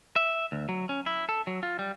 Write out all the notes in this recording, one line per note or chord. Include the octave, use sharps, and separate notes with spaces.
E5
D2
F#3
C#4
E4
A4
F#3
F4
G3